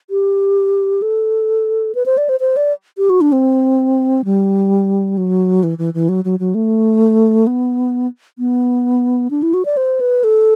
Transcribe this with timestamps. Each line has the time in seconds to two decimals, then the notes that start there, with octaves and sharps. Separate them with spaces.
0.10 G4
1.02 A4
1.95 B4
2.06 C5
2.17 D5
2.29 C5
2.40 C5
2.57 D5
2.98 G4
3.10 F#4
3.21 D4
3.32 C4
4.25 G3
5.17 F#3
5.63 E3
5.78 E3
5.94 E3
6.09 F#3
6.25 F#3
6.40 F#3
6.55 A3
7.47 B3
8.39 B3
9.31 D4
9.43 E4
9.54 F#4
9.65 D5
9.77 C5
10.00 B4
10.24 A4